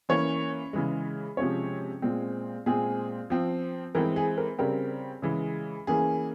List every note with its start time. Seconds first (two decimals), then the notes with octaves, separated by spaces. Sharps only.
0.09 E3 A#3 C#4 C#5
0.73 C#3 E3 G#3
1.37 C3 F3 G#3 C#4 C#5
2.02 A#2 G#3 C4
2.66 A#2 G#3 C4 G#4
3.30 F3 C4
3.95 E3 G#3 C4 A#4
4.16 G#4
4.38 A#4
4.59 C#3 G3 C4 A#4
5.22 C#3 E3 G#3
5.87 E3 A#3 C#4 G#4